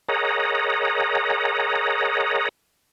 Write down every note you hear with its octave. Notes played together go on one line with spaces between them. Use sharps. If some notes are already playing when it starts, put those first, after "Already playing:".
G#4 A#4 C#5 D#5 F#5 A#5